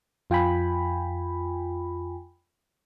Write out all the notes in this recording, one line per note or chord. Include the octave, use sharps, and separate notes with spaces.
F2 F4 G5 G#5 B5